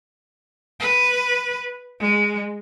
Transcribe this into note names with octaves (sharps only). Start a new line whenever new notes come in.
B4
G#3